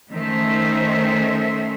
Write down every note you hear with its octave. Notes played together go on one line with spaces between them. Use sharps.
D#3 A3 C#4 C5 E5